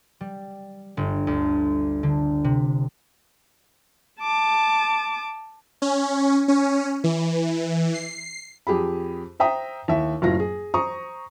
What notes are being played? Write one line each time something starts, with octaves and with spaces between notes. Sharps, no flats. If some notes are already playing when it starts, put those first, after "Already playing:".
G3
G1
D2
D3
C3
A5 D6
C#4
C#4
E3
C7
F2 G4 G#4 B5
C5 E5 G5 A#5 D#6
D#2 E4 E5
F#1 A2 F#3 F4 A#6
G#4
C5 A#5 C#6 D#6